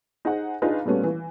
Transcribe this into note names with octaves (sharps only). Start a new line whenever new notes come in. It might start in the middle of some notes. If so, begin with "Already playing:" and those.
D#4 G#4 C5 F#5
D4 D#4 F4 G#4 B4
A#2 G3 A3 B3 C#4 F#4
E3